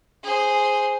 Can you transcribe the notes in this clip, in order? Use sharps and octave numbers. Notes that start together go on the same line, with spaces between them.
G#4 C5